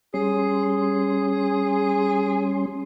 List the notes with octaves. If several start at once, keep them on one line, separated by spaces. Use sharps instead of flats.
G3 C#4 G#4 C6